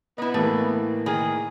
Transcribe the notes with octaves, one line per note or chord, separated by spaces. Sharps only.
B3 E4 D#5
A2 E3 A3 A#3
D#3 G#4